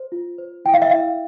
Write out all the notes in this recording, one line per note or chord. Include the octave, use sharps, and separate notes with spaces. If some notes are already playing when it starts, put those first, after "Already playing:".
Already playing: C5
F4
C5
E4 G5
F5
E5
E4 F5